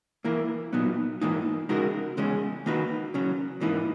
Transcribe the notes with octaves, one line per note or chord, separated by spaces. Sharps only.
E3 A#3 E4 A#4
A#2 F#3 B3 D#4
G#2 E3 A#3 D#4
C#3 G#3 D#4 F#4 A#4
E2 C#3 G#3 C#4
D#3 A#3 D#4 F#4 B4
C#3 F#3 C#4
G#2 E3 A#3 D#4